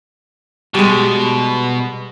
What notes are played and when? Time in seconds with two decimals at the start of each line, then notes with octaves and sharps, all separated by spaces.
0.75 B2 G3 G#3